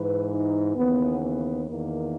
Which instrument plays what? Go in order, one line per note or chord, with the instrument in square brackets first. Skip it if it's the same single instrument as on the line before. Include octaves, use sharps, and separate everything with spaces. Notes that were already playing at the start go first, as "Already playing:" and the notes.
Already playing: [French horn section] G#2 E3 B4
D#4
D#2 C#3 E3 B3
B3
E2 D#3 A#3